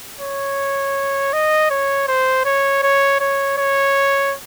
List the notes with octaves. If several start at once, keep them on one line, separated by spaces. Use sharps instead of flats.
C#5
D#5
C#5
C5
C#5
C#5
C#5
C#5